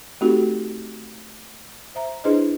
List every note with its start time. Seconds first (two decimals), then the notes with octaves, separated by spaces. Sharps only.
0.21 A3 C4 D#4 F#4 G4 A4
1.95 C5 E5 A#5
2.24 D4 E4 G#4 B4 C5 D#5